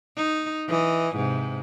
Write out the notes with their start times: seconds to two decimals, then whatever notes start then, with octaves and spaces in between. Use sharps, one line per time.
0.17 D#4
0.68 E3 D#5
1.16 G#2 C3